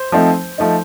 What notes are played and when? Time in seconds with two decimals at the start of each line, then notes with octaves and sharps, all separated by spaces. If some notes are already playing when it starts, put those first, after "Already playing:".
Already playing: C5
0.12 F3 A3 C4 D#4
0.58 F3 A3 D#4